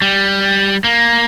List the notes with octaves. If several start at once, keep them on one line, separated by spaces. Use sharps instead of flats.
G3
A#3